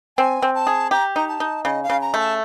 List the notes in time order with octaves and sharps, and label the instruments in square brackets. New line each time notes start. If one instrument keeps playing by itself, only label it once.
[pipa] C4 [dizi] G#5
[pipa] C4
[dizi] A5
[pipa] G#4
[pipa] G4 [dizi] A#5
[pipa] D#4 [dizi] A#5
[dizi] A5
[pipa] D#4
[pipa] C#3 [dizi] D#5
[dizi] F5
[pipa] C#3
[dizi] A#5
[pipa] A3
[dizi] A5